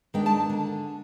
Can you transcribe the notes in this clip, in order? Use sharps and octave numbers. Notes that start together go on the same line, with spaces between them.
D#3 G#3 B3 D4 G5
A5
D3